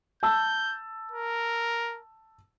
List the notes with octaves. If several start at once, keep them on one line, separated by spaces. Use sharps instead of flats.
A5 E6 G6
A#4